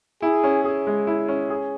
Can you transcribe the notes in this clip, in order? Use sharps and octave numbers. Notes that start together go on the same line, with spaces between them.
E4 G#4
C#4
G#4
G#3
E4
C#4
G#4